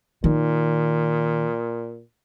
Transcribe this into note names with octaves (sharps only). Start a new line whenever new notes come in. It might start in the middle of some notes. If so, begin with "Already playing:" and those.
A#2 D#3